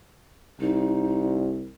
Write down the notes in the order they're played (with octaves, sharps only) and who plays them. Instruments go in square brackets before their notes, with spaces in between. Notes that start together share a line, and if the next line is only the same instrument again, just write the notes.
[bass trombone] C2 [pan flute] D#4